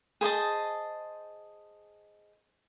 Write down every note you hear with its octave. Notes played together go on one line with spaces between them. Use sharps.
G#4 C5 D#5 A5